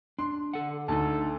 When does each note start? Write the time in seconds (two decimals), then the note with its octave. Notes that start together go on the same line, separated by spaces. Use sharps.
0.19 D4 C6
0.53 D3 A4 F#5
0.88 D2 D#4 A4 A5